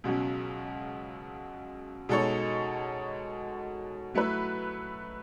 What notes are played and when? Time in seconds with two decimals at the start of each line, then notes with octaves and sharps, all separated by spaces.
0.04 C#2 B2 F#3 C#4
2.09 B2 G#3 D#4 A4 C#5
4.14 F#3 A3 E4 B4